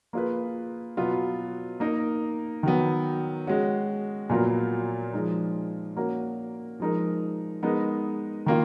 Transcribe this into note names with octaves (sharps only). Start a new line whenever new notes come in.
A#3 F4 G#4 B4
B2 F#3 B3 F4
A#3 D#4 A#4
D#3 F#3 B3
G#3 C#4 F#4
A#2 F#3 B3 F4 A#4
F3 G#3 D#4
A#3 C#4 F#4 A#4
F3 G#3 D#4 A#4
G#3 B3 D#4 A#4
D#3 A#3 F4